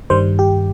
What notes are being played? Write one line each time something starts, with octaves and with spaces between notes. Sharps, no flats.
G2 D#3 G3 C5
G4